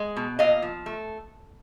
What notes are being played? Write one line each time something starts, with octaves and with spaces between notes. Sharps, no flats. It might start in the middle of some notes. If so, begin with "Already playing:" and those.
Already playing: G#3
B2
A#2 D#5 F5
F3
A3